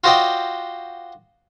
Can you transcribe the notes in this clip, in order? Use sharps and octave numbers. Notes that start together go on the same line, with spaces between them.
F4 F#4 C5 D5 D#5 G5